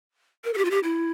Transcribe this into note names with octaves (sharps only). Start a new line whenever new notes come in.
A#4
A4
G4
F4
G4
E4